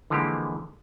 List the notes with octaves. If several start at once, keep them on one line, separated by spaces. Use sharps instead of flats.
D3 E3 F3 G#3 A#3 G4